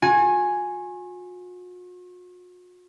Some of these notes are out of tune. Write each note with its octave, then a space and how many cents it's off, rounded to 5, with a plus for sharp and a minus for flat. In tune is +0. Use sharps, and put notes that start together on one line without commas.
F#4 -45 G#5 +0